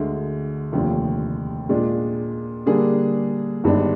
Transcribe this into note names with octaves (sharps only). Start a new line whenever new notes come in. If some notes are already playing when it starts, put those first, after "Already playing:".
Already playing: D2 D3 G#3
F1 D#2 D3 F3
A#2 G#3 D4 F4
D3 G3 A#3 D4 G#4
G1 G2 D#3 G#3 D4